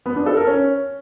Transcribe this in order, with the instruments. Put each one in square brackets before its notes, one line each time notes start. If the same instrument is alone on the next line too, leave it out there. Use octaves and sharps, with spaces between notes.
[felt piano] B3
D4
A4
A#4
C#4